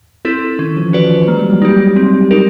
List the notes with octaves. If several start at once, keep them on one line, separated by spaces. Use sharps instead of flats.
C4 E4 A4
D#3 C#4
F3
E3
F#4 B4 D5
F3
G#3 A#3
G3
F#3
G3 D#4 G4
C4
D#4 G4 A#4